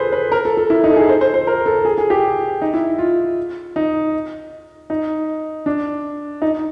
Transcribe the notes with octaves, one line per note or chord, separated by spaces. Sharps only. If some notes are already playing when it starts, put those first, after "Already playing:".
Already playing: G#4 A4 B4 C5
B4
A#4
A4
A4
E4
D#4
A4
G#4
C5
C5
C5
A#4
A4
G#4
G#4
G4
D#4
E4
F4
D#4
D#4
D4
D#4